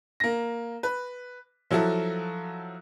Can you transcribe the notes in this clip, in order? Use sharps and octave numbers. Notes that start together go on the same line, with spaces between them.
A#3 A#6
B4
F3 F#3 E4 F#4 A4